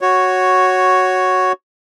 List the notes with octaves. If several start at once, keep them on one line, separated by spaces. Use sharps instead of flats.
F#4 C#5